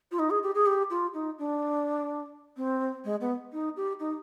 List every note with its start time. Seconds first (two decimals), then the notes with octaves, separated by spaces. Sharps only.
0.11 F4
0.19 D#4
0.30 G#4
0.42 G4
0.54 G#4
0.66 G4
0.90 F4
1.13 D#4
1.38 D4
2.56 C4
3.04 G#3
3.20 B3
3.52 D#4
3.76 G4
3.99 D#4